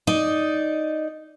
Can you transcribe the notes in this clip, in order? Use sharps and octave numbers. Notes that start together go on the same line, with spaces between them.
D#4 D5